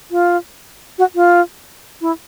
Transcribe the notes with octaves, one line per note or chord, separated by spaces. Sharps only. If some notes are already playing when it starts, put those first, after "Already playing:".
F4
F#4
F4
E4